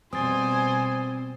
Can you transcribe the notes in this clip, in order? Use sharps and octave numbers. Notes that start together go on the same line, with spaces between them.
B2 G3 C4 C5 G#5 D#6 A6